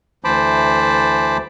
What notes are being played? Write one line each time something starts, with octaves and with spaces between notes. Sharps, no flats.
D2 E3 C5 A5 B5 D6